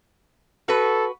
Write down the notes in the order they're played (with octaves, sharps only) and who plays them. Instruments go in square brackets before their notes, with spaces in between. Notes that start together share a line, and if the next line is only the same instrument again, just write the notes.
[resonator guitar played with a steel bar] F#4 B4 [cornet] A4